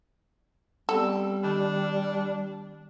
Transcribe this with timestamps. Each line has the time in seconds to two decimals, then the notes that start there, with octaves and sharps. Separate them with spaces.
0.89 G3 B3 C4 A4
1.43 D#3 D4 G4 B5